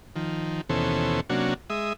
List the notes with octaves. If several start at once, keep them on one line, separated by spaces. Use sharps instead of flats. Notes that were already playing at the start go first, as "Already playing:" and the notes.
D#3 F3
D#2 B2 E3 C#4 A4 C5
C3 F#3 A#3 C#4 D4 F#4
G#3 E5 D#6